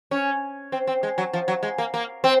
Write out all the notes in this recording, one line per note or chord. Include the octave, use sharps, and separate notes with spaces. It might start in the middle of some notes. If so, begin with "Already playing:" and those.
C#4
C4
C4
G#3
F#3
F3
F#3
G#3
A#3
A#3
C4